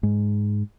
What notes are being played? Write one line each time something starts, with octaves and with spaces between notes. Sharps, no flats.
G#2